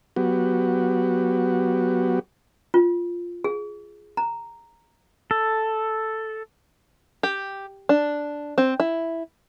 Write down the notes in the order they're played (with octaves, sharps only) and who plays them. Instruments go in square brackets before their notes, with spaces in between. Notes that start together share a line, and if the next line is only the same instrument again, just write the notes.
[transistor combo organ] F#3 B3 F#4 G4
[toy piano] F4
G#4
A#5
[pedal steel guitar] A4
[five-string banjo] G4
D4
C4
E4